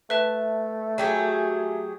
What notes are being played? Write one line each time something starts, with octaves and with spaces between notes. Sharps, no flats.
A3 B4 E5 A5
F#3 G4 G#4